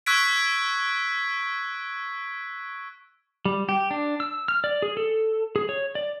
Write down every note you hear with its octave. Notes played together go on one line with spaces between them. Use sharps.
C#6 E6 F#6 G#6 B6 D7
G3
G4
D4
E6
F6
D5
G#4
A4
G#4
C#5
D5